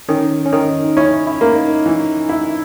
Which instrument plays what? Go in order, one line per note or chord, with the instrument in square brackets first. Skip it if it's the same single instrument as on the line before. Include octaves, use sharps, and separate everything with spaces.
[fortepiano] D#3 [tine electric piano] C#4
[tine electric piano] C#4
[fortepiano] D#3 [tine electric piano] D#4
[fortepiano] C#4 [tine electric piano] E4
[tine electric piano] E4
[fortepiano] A#3
[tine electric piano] D#4
[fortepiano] E3
E4